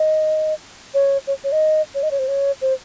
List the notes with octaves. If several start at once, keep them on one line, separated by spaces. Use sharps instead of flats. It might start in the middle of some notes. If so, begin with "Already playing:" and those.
Already playing: D#5
C#5
C#5
C#5
D#5
C#5
D#5
C#5
C5
C#5
C5